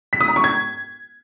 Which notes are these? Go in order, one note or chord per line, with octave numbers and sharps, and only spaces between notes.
B6
D#6
A#5
C#6
G#6